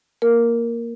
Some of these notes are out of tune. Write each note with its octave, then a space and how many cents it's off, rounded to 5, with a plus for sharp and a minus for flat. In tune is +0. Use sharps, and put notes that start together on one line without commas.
A#3 +0 A#4 +0